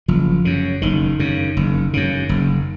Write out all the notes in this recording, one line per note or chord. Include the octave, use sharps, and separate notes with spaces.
F#1 F3
F#2 C#3
F#1 D#3
F#2 C#3
F#1
F#2 C#3
F#1